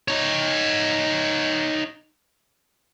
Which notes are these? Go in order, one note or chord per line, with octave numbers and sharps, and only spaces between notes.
D#4 C#5